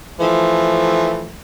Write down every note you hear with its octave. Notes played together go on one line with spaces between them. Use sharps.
E3 F3 A3